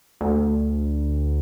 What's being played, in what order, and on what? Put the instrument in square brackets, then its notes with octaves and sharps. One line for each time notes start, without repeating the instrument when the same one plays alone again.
[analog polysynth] D2